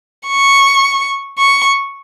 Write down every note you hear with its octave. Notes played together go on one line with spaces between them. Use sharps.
C#6
C#6